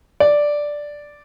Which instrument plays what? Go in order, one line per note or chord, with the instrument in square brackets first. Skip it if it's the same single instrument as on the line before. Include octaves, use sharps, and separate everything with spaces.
[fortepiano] D5